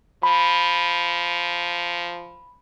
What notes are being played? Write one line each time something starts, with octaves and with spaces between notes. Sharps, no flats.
F3 B5